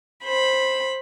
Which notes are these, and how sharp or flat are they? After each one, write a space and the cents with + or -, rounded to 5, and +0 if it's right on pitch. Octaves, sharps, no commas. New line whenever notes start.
C5 +10 B5 +0